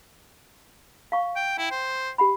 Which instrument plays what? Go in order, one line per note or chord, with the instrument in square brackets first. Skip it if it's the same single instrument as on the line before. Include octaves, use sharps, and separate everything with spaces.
[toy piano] F5 C#6
[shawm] G5
[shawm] E4 [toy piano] G5
[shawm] C5
[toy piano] G4 F#5 B5